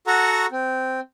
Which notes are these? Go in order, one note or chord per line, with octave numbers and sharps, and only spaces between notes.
F#4 A4 F#5 A#5 C#6
C4